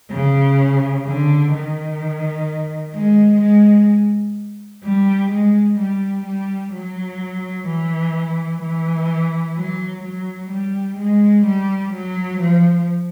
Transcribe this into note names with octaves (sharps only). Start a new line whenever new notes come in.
C#3
D3
D#3
G#3
G#3
G3
G#3
G3
G3
F#3
E3
E3
F#3
F#3
G3
G#3
G3
F#3
F3